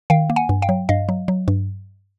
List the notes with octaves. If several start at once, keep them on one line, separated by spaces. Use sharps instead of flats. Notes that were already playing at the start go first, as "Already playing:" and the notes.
D#3 F5 G5
A#3
F#5 G#5
G2
F5 G5
F#3
G2 D#5 F5
F#3
F#3
G2